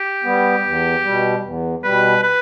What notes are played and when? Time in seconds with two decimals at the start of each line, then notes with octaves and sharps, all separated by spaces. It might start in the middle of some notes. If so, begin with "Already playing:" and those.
Already playing: G4
0.24 G3 B3
0.64 E2
1.04 B2 G3
1.43 E2
1.83 B2 G3 B4
2.23 B4